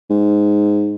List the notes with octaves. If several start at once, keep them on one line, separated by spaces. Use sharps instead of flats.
G#2